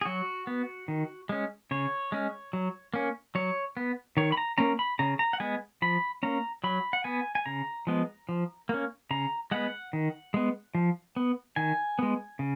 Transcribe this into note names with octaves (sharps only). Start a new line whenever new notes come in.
G#4
F#3 F#4
B3
D#3
G#3 C#4
C#3 C#5
G#3 C#4
F#3
A#3 C#4
F#3 C#5
B3
D#3 C#5
B5
A#5
A#3 C#4 A#5
B5
C#3 A#5
A#5
F#5
G#3 B3 G#5
F3 B5
A#3 C#4 A#5
F#3 B5
F#5
B3 G#5
G#5
C#3 A#5
F3 G#3 B3
F3
A#3 C#4
C#3 A#5
G#3 B3 F#5
D#3
G#3 B3
F3
B3
D#3 G#5
G#3 B3
C#3